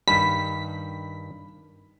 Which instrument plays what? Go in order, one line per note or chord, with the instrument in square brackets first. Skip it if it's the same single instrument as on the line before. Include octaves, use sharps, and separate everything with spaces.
[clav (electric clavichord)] G2 D#3 G3 [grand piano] B5 [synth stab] B6